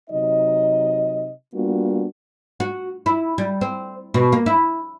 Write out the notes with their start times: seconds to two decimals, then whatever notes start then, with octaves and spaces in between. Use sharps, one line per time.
0.10 C3 F#3 D#4 D#5
1.53 G3 A#3 B3 D4 F4 F#4
2.60 F#4
3.06 E4
3.38 G3
3.61 C4
4.14 B2
4.32 A#3
4.46 E4